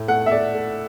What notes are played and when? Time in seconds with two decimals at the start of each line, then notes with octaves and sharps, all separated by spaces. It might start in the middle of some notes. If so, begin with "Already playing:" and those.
Already playing: A2
0.08 A3 F#5
0.26 E5
0.32 A3 D5
0.54 A3